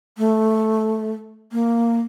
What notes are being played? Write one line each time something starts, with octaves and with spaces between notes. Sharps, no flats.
A3
A#3